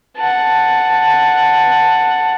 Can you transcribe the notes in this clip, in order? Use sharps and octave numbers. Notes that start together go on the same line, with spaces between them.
F#5 A5